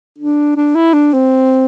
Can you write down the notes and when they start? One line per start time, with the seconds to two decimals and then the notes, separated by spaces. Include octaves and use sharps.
0.18 D4
0.56 D4
0.75 E4
0.94 D4
1.13 C4